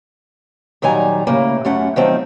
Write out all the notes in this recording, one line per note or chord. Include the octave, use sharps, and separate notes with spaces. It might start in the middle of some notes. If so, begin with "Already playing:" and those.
A#2 D#3 F#3 G3 G#5 A#5
A2 C#3 A#3
F#2 A3 C#4 F#5
D#3 F3 F#3 A3 C4